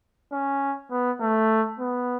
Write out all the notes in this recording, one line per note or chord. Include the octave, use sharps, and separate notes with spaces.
C#4
B3
A3
B3